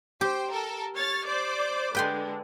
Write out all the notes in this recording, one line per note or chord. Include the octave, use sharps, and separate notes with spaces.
G4 C5 G5
A4 A#4
C#5 F6 A6
C5 D5 D6
D3 G#3 B4 G5 C6